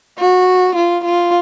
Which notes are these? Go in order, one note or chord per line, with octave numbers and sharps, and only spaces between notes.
F#4
F4
F4